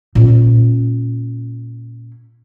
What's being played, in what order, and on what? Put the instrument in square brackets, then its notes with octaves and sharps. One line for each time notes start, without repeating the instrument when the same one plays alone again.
[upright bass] A#2 C#4